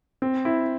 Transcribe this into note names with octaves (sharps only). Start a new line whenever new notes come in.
C4
E4